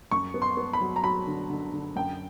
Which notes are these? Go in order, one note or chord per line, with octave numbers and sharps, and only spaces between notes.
F#2 C#6
B3
C6
B3
B5
F#3
A#5
F#3 B5
D3
D3
D3
F#2 G5